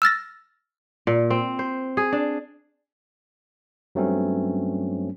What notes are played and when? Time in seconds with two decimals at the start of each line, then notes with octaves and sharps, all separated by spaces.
0.02 E6 F6 A6 A#6
1.07 A#2
1.30 C4
1.59 C5
1.97 G#4
2.13 D4
3.95 G2 F#3 A3 C4 C#4